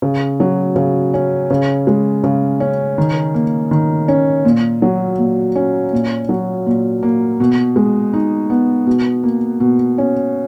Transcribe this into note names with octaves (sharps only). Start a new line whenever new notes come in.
C#3
F#3
C#3
C#4
C#3
G#3
C#3
C#4
D#3
A#3
D#3
C#4
A#2
F#3
A#2
C#4
A#2
F#3
A#2
A#3
B2
G#3
D#4
B3
B2
A#3
B2
C#4